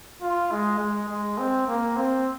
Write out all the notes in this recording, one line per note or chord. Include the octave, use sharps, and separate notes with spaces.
F4
G#3
G#3
G#3
C4
A#3
C4